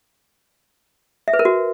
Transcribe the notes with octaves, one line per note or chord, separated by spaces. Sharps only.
E5
B4
A#4
F#4